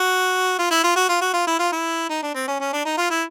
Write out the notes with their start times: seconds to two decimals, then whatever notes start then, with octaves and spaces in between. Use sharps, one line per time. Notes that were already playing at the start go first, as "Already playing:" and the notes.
Already playing: F#4
0.59 F4
0.71 E4
0.84 F4
0.96 F#4
1.09 F4
1.21 F#4
1.34 F4
1.47 E4
1.59 F4
1.72 E4
2.10 D#4
2.23 D4
2.35 C4
2.47 C#4
2.60 C#4
2.73 D4
2.85 D#4
2.97 F4
3.10 E4